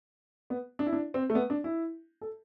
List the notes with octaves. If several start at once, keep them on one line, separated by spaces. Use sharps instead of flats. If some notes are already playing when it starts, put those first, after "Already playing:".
B3
D4
E4
D4
C4
A3
B3
D4
E4
A4